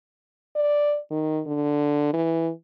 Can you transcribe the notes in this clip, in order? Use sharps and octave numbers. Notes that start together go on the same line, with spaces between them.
D5
D#3
D3
E3